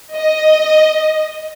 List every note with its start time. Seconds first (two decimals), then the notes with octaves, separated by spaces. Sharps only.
0.16 D#5